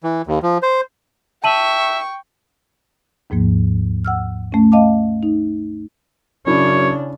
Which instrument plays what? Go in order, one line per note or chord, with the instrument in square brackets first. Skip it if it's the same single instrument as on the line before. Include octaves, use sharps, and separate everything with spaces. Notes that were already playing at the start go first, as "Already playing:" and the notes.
[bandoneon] E3
D#2
F3
C5
[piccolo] E5 [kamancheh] G5 C#6 [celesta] A5 D#7 F#7
[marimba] D#2 G#2 F3 A#3
F#5 E6 F6
A3 C#4
D#5 F5 A5 D6
D#4
[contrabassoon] F#2 [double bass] C#3 D4 [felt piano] C#4 E4 [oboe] C#5